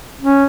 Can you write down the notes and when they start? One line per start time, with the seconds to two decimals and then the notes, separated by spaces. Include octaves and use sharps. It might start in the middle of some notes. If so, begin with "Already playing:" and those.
0.21 C#4